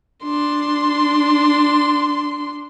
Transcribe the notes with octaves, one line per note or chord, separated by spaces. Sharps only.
D4 C6